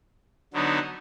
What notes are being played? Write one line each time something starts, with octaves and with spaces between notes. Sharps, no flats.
D3 F#3 B3 D#4